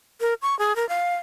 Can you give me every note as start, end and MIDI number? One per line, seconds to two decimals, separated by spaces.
0.21 0.34 70
0.42 0.57 85
0.59 0.75 68
0.76 0.88 70
0.89 1.15 77